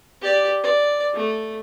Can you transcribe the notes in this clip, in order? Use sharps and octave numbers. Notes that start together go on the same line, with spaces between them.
G4 D5
D5
A3